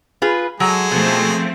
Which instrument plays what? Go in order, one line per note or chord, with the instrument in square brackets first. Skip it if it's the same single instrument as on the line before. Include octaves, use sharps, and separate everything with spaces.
[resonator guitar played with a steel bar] F4 G#4 B4
[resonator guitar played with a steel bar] F#3 [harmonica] G#3 A4
[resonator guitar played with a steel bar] B2 [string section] F3 A3 C4